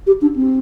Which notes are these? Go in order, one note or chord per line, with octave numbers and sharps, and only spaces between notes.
G4
D4
C4